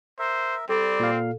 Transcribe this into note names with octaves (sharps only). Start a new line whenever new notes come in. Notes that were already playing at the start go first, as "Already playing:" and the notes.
A#4 C5 E5
G3 C4 A4 D5
A#2 F5